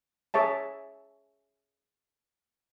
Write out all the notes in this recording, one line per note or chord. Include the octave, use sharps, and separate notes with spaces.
G#4 C#5 E5 A5